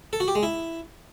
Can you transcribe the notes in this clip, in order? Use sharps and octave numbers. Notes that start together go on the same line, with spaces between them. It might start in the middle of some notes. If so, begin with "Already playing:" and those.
A4
F#4
G4
G#3
E4